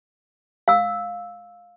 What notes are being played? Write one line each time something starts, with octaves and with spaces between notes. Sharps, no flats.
F5 E6